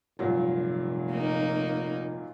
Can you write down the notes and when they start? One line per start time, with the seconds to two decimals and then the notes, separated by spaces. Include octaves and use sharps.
0.19 F1 G2 A#2 F#3
1.10 A#3 D#4